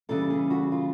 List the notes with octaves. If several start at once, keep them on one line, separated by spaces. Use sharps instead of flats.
C#3 E3 G3 A4
G#4
F#4
F4